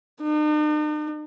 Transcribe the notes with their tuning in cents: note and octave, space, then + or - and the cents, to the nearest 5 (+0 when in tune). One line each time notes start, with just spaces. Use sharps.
D#4 -45